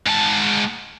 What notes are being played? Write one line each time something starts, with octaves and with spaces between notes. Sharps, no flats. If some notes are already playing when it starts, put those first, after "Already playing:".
G#2 A5